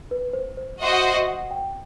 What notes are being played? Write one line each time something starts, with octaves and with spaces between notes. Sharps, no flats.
B4
C5
C5
F#4 C5 D#5 E5
F#5
E5
D#5
F#5
G5